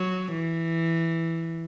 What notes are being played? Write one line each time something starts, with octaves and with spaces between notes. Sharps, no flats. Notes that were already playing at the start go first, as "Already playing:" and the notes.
Already playing: F#3
E3